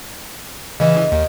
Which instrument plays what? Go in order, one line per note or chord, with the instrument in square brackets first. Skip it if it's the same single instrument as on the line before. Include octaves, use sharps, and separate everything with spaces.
[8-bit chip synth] C#3 E3 [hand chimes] D#5
[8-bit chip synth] D#2